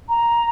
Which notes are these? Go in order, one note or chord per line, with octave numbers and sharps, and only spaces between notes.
A#5